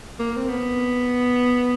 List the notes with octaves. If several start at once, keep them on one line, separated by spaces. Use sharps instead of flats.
A#3
C4
B3